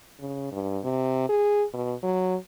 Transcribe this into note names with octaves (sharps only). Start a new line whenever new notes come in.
C#3
G2
C3
G#4
B2
F#3